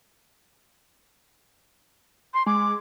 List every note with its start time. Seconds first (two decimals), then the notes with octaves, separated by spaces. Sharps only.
2.34 C6
2.46 G#3 D6